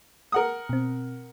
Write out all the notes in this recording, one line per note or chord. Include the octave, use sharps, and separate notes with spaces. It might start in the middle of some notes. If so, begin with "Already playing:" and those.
A#4 F#5 D#6
B2 C4